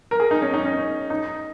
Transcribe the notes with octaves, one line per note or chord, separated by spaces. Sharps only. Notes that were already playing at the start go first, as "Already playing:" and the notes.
A#4
G#4
D#4
C#4
D#4
C#4
D#4